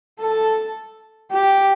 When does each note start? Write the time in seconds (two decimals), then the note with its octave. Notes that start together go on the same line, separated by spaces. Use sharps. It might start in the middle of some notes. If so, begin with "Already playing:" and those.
0.21 A4
1.31 G4